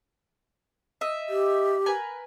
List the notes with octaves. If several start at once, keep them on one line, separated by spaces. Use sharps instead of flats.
D#5 E5
G4
A#4 B4 G#5